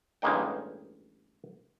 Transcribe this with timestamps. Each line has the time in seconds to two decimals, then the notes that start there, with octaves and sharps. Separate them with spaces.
0.22 A1 G2 G#3 A#3 D#4 G5